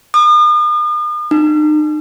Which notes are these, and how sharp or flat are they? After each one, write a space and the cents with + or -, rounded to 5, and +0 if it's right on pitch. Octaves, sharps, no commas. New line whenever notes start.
D#6 -45
D#4 -40